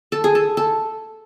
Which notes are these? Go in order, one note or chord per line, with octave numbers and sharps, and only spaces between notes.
A4
G#4
A4
A4